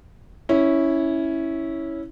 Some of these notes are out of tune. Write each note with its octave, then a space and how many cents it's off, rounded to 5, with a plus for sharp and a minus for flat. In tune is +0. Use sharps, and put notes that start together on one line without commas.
C#4 +0 E4 -10 C#5 +0